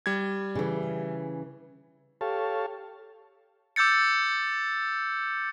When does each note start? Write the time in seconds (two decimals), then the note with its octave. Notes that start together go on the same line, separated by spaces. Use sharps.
0.06 G3 G#6
0.55 C#3 E3
2.21 G4 A4 C#5 F5 A5
3.76 D6 E6 G6 A6 C#7